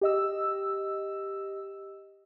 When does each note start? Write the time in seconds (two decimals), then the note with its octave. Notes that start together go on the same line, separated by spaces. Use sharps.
0.01 G4 D#5 E6